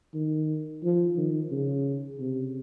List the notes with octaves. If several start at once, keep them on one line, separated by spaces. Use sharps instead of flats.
D#3
F3
D#3
C#3
C3